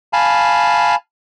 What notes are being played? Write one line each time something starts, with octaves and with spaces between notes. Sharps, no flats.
F5 G#5 A5 B5